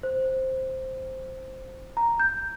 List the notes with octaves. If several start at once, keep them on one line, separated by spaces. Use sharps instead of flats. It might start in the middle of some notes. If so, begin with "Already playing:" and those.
C5
A#5
G6